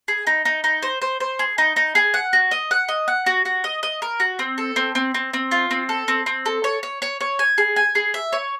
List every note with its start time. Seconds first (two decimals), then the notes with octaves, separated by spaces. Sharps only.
0.08 G#4
0.27 D#4
0.45 D#4
0.64 D#4
0.83 C5
1.02 C5
1.20 C5
1.39 G#4
1.58 D#4
1.76 D#4
1.95 G#4
2.14 F#5
2.33 F#4
2.51 D#5
2.71 F#5
2.89 D#5
3.08 F#5
3.26 F#4
3.45 F#4
3.64 D#5
3.83 D#5
4.02 A#4
4.20 F#4
4.39 C4
4.58 A4
4.76 C4
4.95 C4
5.14 C4
5.33 C4
5.51 F4
5.71 C4
5.89 A4
6.08 C4
6.26 C4
6.46 A4
6.64 C#5
6.83 C#5
7.02 C#5
7.20 C#5
7.39 G#5
7.58 G#4
7.76 G#5
7.95 G#4
8.14 E5
8.33 C#5